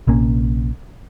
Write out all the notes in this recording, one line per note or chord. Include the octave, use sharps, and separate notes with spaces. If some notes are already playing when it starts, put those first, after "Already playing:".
A#1 C3 A#3 C#4